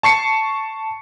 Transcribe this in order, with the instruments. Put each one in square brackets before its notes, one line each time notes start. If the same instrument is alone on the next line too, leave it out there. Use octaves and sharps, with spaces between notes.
[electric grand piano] A5 C#6 C7 C#7